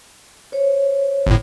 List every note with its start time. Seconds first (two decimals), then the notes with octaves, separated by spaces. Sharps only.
0.52 C5 C#5
1.27 G1 A2